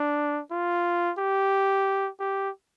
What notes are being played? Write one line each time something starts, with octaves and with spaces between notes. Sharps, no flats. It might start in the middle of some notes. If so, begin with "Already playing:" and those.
Already playing: D4
F4
G4
G4